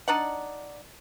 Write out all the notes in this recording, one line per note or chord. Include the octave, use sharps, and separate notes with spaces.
D4 D#4 D5 F#5